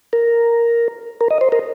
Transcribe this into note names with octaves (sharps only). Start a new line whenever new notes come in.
A#4
A#4
D#5
C5
A#4